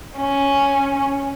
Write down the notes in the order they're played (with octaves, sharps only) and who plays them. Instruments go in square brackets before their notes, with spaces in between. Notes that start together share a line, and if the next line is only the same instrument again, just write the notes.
[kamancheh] C#4